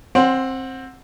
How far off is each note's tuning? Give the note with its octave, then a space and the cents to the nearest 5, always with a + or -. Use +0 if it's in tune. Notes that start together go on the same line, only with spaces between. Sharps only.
C4 +15 F#5 -15 C6 +0